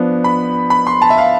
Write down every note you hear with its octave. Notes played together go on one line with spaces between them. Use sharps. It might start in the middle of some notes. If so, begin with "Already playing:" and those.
Already playing: F3 B3 D4
B5
B5
C6
A5
E5
F5